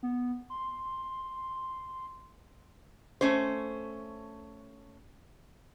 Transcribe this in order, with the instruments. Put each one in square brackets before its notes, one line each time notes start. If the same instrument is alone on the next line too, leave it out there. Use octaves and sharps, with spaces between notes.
[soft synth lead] B3
C6
[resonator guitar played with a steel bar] A3 C#4 C5